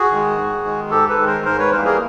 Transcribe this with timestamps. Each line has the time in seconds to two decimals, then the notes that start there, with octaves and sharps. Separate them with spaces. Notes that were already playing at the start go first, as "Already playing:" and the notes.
Already playing: F#4 G#4
0.11 D#3 G#3
0.37 G#2
0.65 D#3 G#3
0.90 G#2 G4 A4
1.08 A4 B4
1.18 D#3 G#3
1.26 A#4 C5
1.45 G#2 A#4 C5
1.59 B4 C#5
1.72 E3 G3 A#3 A#4 C5
1.85 G#4 A#4